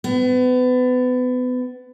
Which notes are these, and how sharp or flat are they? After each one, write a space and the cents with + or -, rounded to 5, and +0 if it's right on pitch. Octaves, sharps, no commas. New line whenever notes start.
B3 +30